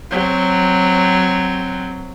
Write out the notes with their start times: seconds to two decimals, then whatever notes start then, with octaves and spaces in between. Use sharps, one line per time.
0.11 F#3 C4